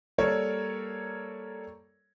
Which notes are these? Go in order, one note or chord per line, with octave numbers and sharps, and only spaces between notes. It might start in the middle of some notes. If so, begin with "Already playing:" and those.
G3 A#3 A4 A#4 C#5